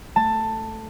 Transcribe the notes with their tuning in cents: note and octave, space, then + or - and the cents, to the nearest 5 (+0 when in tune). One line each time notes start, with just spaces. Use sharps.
A3 +0 A5 +15